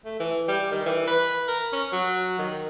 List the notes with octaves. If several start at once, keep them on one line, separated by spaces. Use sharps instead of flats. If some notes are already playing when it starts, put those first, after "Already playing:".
A3
E3
G3
D#3
E3
B4
A#4
C#4
F#3
D#3